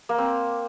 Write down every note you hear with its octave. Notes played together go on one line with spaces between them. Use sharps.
A#3
C4